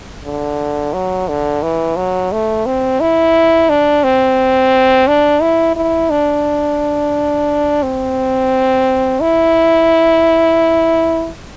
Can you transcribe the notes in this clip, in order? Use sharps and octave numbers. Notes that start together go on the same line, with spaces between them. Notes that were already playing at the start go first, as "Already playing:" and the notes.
D3
F#3
D3
E3
F#3
A3
C4
E4
D4
C4
D4
E4
E4
D4
C4
E4